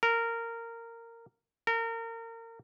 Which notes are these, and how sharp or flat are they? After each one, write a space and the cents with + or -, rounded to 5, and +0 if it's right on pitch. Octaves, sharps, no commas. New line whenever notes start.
A#4 -15
A#4 -30